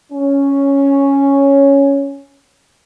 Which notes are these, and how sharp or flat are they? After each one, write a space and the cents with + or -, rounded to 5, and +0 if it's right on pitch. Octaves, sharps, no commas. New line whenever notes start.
C#4 +0